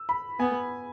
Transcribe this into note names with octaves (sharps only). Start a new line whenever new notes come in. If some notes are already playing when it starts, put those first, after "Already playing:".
Already playing: E6
B5
B3 G#5